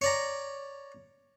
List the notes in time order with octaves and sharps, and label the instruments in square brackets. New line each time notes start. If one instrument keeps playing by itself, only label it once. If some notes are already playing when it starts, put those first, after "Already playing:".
[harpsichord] C#5 D5 A#5